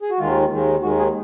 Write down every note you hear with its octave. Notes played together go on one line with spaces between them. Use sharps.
G#4
F#4
D#2 D#3 G#3 F4
D#2 D#3 G#3
D#2 D#3 G#3 F#4
G#4